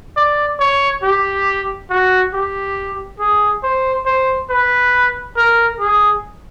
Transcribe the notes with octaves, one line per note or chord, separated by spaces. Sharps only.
D5
C#5
G4
F#4
G4
G#4
C5
C5
B4
A#4
G#4